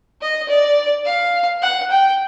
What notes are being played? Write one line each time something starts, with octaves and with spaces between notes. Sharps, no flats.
D#5
D5
F5
F#5
G5